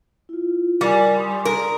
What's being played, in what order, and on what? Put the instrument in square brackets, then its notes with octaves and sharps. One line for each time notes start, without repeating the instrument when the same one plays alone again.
[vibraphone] E4 F4
[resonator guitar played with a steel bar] G3 [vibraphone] A#4 D5 G#5
[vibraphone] C6 D#6
[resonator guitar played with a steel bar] A#4